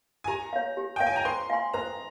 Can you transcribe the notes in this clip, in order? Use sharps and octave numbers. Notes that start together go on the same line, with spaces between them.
G#5
G4 A#5
C#5 F5
G4
C#5 F5 G5
G#5
A#5
C5 C6
F5 G#5 C6
C5 A#5